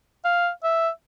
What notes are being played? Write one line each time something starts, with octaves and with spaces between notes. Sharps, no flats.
F5
E5